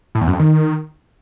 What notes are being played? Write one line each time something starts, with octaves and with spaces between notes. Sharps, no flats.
A2
E2
F#2
F2
D#3